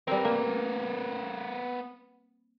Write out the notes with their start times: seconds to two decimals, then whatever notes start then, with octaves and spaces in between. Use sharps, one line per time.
0.07 G3 B3 C4 A#4
0.25 A#3